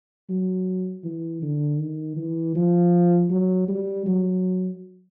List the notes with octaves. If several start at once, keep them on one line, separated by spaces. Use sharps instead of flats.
F#3
E3
D3
D#3
E3
F3
F#3
G3
F#3